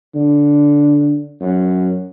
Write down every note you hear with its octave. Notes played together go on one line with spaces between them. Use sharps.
D3
F#2